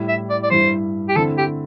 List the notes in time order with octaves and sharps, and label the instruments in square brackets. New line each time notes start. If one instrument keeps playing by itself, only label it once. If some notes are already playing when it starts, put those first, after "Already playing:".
Already playing: [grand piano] A2 G3 E4
[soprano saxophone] E5
D5
D5
[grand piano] G2 G3 E4 [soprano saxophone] C5
[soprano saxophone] G4
[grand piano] D3 A3 C4 E4 [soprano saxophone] A4
[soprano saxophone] G4